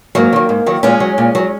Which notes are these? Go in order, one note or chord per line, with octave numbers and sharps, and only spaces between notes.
G#2 F#3 A#3
D#3 F#3
G#2
D#3 F#3
A#2 G#3 C#4
F#3
A#2
F#3